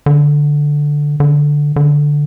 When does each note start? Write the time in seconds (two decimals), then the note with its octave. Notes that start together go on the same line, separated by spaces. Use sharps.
0.06 D3
1.20 D3
1.76 D3